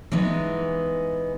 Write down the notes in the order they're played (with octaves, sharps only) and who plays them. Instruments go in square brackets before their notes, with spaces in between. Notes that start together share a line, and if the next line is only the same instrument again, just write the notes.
[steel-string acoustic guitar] E3 G#3 B3 D#4